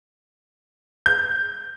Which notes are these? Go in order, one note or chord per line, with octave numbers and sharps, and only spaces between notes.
G6